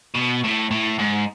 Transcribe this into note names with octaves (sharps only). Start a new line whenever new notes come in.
B2
A2
A2
G#2